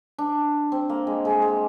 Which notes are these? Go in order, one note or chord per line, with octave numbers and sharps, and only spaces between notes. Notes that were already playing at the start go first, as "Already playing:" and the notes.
D4
C4
A#3
G#3
G#3
G#3